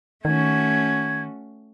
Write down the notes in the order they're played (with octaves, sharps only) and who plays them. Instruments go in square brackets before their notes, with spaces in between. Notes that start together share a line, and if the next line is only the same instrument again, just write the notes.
[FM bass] D#3 [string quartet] A3 C#4 F#4 [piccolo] G#6